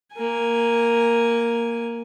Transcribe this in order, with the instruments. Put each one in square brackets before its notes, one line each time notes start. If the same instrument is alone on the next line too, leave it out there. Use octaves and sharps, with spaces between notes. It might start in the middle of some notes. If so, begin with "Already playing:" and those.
[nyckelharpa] A#3 G#5